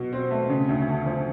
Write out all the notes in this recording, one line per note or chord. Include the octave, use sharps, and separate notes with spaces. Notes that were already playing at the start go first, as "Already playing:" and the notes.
Already playing: B2 F#3
C4
A3
C#3
D2
A3
F3